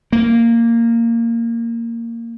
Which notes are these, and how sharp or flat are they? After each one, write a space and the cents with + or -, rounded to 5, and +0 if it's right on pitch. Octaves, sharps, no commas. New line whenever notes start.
A#3 -10